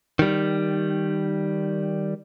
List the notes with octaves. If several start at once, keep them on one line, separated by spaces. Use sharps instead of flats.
D#3 G3